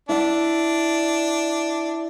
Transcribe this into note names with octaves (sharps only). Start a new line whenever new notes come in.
D4 E4 E5 F#5